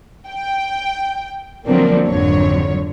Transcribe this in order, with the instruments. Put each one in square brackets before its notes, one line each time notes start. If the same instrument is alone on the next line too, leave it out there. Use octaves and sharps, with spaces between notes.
[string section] G5
D3 F3 F#3 A#3 C4 D4
G#1 F2 D3 F#3 C#5